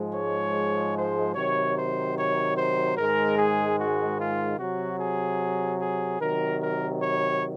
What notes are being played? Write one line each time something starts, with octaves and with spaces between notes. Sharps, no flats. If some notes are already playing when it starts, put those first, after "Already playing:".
Already playing: G#2 F3 G#3
C#5
C5
C3 D#3 F#3 C#5
C5
C#5
C5
G#2 D#3 G#3 A#4
G#4
F#4
F4
C3 F#3 F#4
G#4
G#4
C3 D#3 F#3 A#4
A#4
C#5